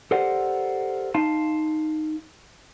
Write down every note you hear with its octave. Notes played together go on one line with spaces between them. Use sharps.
G4 A4 A#4 C5 D5 F#5
D#4 F5 A5 C6